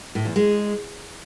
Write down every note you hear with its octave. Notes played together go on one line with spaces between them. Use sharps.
A2
E2
G#3